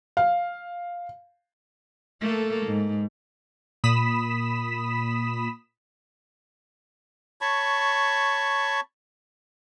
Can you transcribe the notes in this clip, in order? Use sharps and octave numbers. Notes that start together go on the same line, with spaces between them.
F5
A3 A#3 A4
G#2
A#2 B5 D#6 B6 E7
C#5 A5 B5 C#6